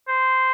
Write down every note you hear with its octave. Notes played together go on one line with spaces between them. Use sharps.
C5